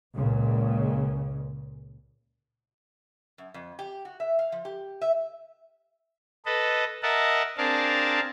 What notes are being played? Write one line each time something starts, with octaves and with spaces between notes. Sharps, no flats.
C#2 A#2 C#3
F#2
F2
G4
F#4
E5
F5
F3
G4
E5
A4 B4 D#5
A#4 D#5 E5 F#5 A5
C4 D4 G#4 A#4 F5 A5